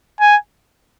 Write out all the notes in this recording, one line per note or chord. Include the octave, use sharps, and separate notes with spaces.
G#5